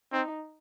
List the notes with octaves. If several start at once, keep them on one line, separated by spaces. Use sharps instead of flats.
C4 D#4